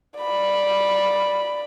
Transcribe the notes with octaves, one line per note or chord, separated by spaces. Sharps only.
D5 B5